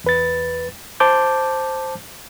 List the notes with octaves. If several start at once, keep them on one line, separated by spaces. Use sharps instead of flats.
E2 B4 A6
C5 A5 D6 G6